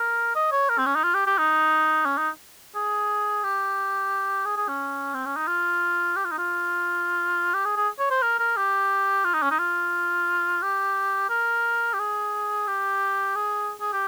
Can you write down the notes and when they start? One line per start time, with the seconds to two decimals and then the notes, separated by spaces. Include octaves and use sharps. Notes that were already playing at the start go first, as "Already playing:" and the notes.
Already playing: A#4
0.35 D#5
0.52 C#5
0.69 A#4
0.78 C4
0.86 C#4
0.96 D#4
1.04 F4
1.14 G4
1.27 G4
1.38 D#4
2.06 C#4
2.17 D#4
2.75 G#4
3.44 G4
4.45 G#4
4.57 G#4
4.68 C#4
5.14 C4
5.26 C#4
5.36 D#4
5.48 F4
6.16 G4
6.25 F4
6.31 D#4
6.38 F4
7.54 G4
7.65 G#4
7.76 G#4
7.99 C#5
8.10 C5
8.22 A#4
8.39 A#4
8.57 G4
9.25 F4
9.34 D#4
9.42 C#4
9.51 D#4
9.59 F4
10.62 G4
11.30 A#4
11.94 G4
11.99 G#4
12.67 G4
13.35 G#4
13.81 G#4
13.93 G4